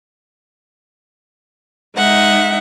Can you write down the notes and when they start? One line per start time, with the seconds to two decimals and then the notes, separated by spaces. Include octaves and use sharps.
1.97 G#3 D#4 E5 F#5